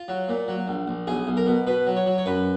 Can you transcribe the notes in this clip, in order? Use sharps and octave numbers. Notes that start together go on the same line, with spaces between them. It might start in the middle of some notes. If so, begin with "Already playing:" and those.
Already playing: F4
F#3
A#2
F#3
A#1
A#1
B1 G#4
B1
A#4
B2
B2 B4
F#3
C#5
F#3
C#5
F#2 B4